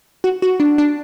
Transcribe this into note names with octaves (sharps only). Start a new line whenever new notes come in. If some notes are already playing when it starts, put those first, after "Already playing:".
F#4
F#4
D4
D4